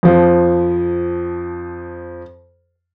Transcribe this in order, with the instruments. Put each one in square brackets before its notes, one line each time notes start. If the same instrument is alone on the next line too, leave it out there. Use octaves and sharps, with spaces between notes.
[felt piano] F2 F3